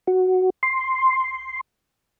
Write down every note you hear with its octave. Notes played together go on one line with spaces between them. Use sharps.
F#4
C6